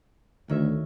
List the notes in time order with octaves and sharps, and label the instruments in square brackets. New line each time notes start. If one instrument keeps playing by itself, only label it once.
[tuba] D2 [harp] D#3 C#5 E5